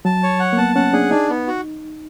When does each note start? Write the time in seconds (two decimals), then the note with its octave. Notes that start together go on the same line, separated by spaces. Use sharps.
0.05 F#3 A5
0.23 C#5
0.40 F#5
0.53 A#3
0.58 B3 A5
0.75 C#4 F#5
0.93 D4 G#4
1.11 D4 D#4
1.29 B3
1.47 F#4